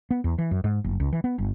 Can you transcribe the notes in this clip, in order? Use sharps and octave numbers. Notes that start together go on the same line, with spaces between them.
B3
E2
E3
F#2
G#2
F#1
C#2
E3
B3
G1